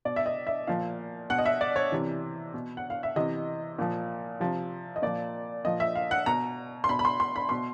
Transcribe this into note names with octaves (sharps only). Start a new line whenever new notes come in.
B2 D5
E5
D#5
E5
A#2 F3 F5
B2 F#5
D#5
E5
D5
C#5
C3 E3
B2
F#5
F5
E5
C3 E3 D#5
A#2 F3
C3 F3
D#5
A#2 F3 D5
A#2 F3 D#5
E5
F5
F#5
B2 A#5
C6
B2 B5
B5
C6
C6
B5
B2 C6